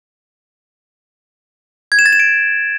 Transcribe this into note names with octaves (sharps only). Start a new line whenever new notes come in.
G#6
E7
A6
E7
D7